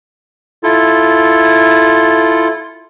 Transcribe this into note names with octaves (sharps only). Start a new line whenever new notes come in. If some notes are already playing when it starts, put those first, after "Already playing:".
E4 F4 A4